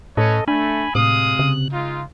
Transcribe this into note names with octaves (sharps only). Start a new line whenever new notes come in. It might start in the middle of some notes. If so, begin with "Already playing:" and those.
A2 C#4 A4 B4 C#5 D#5
A3 D4 G#5 B5
A2 C3 G#3 F5 D#6 F#6
C#3
G#3 D#4 F4